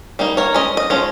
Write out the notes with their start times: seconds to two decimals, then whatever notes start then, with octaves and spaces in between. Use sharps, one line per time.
0.19 G3 A#3 D#4
0.37 A#4 C#5
0.54 G#3 C#4 D#5
0.77 D#5
0.90 F3 G#3 C#4